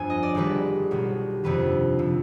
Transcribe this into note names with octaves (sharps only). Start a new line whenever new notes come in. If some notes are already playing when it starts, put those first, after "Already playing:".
Already playing: G1 F2 F3 B3 G#5
D#5
D5
G#1 G#2 D#3 G3 B4
B1 B2 G3 B3
G1 F2 C3 D#3 B4
C3 F3